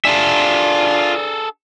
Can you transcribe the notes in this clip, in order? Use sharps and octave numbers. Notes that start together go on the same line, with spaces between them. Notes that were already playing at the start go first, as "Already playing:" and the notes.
D4 F4 G#4 A4 E5